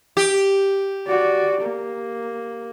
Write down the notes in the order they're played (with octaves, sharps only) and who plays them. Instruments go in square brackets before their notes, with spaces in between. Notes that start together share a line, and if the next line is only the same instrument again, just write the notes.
[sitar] G4
[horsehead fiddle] F#4 D5
A#3